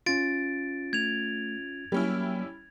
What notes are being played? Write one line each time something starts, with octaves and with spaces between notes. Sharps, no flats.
C#4 F4 A6 D7
A3 G#6 F7
F#3 G3 A#3 C#4 E4